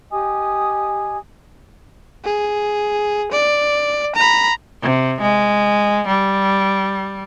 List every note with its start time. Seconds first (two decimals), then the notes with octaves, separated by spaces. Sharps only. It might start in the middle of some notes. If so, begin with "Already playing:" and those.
0.10 G4 D#5 G#5 D#6
2.25 G#4
3.32 D5
4.15 A#5 B5
4.82 C3
5.21 G#3
6.08 G3